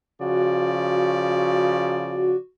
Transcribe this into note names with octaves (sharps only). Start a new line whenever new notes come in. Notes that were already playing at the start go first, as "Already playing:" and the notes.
C#3 F3 F#4 D5